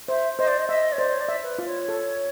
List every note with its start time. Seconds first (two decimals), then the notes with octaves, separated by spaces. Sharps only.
0.08 C5 E5
0.39 C5 D#5
0.48 D5
0.58 D#5
0.68 D#5 E5
0.92 C#5
0.98 C5 D5
1.14 C#5
1.21 D5
1.29 E5
1.43 B4
1.59 F4
1.66 C#5
1.88 A4